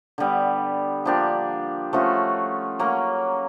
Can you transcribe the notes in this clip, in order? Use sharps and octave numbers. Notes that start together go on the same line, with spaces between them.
D3 G3 B3
F3 A#3 D4 G4
F3 A3 C#4 F#4
F#3 A#3 C#4